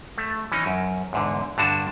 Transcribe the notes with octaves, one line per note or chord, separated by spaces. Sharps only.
A3
E3 C#4 D#4
F#2
E2 G#2 D3
G2 D3 D4 F#4 A5